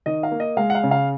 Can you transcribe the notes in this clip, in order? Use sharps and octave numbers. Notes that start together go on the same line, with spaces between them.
D#3 D#5
F5
A#3
D#5
G#3 F5
F#5
F5
C#3
F5